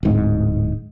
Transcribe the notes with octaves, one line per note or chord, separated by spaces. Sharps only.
D1 G#2